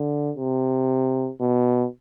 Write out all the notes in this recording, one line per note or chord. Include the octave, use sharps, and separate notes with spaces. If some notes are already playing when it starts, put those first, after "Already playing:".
Already playing: D3
C3
B2